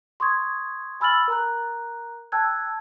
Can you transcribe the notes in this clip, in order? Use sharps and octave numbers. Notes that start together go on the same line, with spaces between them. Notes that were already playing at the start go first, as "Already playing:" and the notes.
C6 C#6 D#6 G#6
G#5 B5 E6 F6 A6 F#7
A#4 A#5 F#6
G5 A5 E6 F#6 G#6